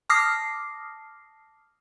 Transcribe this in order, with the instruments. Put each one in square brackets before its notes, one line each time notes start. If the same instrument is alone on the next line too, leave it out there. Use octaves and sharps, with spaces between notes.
[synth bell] A5 D6 D#6 F6 A#6 C7